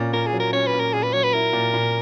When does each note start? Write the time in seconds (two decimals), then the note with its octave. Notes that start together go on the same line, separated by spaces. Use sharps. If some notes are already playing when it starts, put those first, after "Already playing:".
Already playing: A#2 C#4
0.13 A#2 A#4
0.26 G#4
0.32 F#3
0.40 A#4
0.53 C#4 C#5
0.67 B4
0.73 A#2
0.80 A#4
0.93 A#2 G#4
1.03 B4
1.13 F#3 C#5
1.23 B4
1.34 E4 A#4
1.53 A#2
1.74 A#2